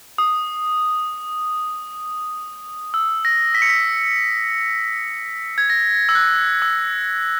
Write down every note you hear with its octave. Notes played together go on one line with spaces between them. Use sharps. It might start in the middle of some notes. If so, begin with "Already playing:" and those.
D#6
E6
A#6
B6
C#7
B6
G#6
A#6
E6
F#6
E6